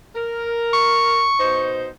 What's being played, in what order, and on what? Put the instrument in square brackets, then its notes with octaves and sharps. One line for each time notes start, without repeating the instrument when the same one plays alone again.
[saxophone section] A#4
[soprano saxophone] C#6
[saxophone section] B2 D#4 C5